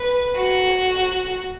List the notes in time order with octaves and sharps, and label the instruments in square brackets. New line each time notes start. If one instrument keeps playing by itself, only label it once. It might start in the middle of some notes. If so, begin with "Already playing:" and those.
Already playing: [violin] B4
F#4